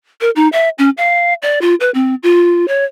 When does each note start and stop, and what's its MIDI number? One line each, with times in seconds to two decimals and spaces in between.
0.21 0.30 70
0.36 0.48 63
0.52 0.69 76
0.78 0.90 61
0.97 1.34 77
1.42 1.61 74
1.61 1.75 65
1.80 1.90 71
1.94 2.15 60
2.23 2.68 65
2.68 2.84 73